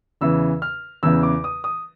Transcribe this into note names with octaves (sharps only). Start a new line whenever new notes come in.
E2 C#3 E3 E6
F6
E2 C#3 E3 E6
D6
D#6
D#6